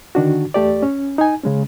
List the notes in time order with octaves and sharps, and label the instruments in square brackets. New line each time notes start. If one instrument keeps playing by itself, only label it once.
[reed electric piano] D3 D#3 D4 F#4
E2 A3 G4 D5
C#4
D#4 G#5
C#3 G#3 C#4